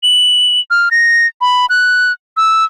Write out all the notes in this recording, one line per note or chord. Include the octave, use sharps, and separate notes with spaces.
F#7
F6
A#6
B5
F#6
E6